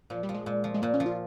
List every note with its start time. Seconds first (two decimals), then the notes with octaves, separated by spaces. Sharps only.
0.10 A#2 F3
0.23 G3
0.29 F3
0.34 G#3
0.46 A#2
0.64 F3
0.74 G#3
0.82 A#2 A#3
0.94 C#4
1.00 F3
1.06 F4